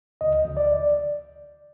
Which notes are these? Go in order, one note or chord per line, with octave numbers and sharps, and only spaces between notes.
D2 D#5
D2
D5